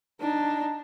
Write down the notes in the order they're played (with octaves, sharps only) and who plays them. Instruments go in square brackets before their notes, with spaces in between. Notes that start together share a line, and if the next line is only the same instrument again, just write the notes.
[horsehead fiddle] D4 D#4